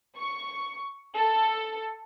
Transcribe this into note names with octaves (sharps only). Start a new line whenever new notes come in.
C#6
A4